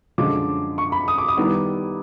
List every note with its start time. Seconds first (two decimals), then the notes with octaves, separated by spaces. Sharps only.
0.18 F#2 D3 F3 G#3 D6
0.78 C#6
0.92 B5
1.08 D#6
1.18 D6
1.28 D#6
1.37 D#3 G3 B3 E4